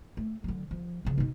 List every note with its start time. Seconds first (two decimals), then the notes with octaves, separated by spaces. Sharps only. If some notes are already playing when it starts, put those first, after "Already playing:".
0.17 A3
0.44 D3 F#3
0.71 F3
1.05 C#3 F3
1.18 B2 D#4